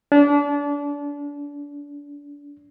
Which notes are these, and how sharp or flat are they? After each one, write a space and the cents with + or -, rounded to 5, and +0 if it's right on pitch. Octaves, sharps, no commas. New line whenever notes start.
D4 -30